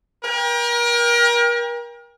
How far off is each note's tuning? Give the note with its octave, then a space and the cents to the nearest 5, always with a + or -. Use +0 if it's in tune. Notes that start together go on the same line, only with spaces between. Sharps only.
A#4 +35 G5 +30